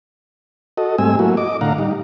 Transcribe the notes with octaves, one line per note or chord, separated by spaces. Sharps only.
F#4 A4 D#5
G#2 G3 A3 C4 G#5 E6
F#3 A3 A#3 E4 F#4
D#5 D6
A2 D3 F5 F#5 A#5
G3 D#4